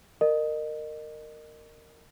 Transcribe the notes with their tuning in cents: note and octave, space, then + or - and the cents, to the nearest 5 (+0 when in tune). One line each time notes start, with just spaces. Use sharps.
A#4 -15 D#5 -30